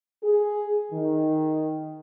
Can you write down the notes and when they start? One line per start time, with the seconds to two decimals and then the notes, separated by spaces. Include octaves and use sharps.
0.23 G#4
0.92 D#3